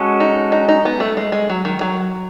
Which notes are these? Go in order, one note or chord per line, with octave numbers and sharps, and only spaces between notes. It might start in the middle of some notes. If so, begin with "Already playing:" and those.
Already playing: G#3 C#4 F#4 A4
D#4
D#4
D#4
B3
A3
G#3
G#3
F#3
D#3
F#3